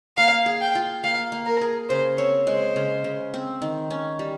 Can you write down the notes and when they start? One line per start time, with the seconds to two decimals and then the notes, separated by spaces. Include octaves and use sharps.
0.17 A#3 F5
0.46 G#4
0.61 G5
0.75 F4
1.04 A#3 F5
1.32 A#3
1.46 A#4
1.61 G#4
1.89 C#3 C5
2.18 C4 C#5
2.47 G#3 C5
2.76 C#3
3.04 C#3
3.34 C4
3.62 D#3
3.90 C#4
4.19 G3